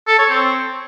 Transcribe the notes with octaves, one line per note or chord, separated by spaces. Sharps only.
A4
C#5
C4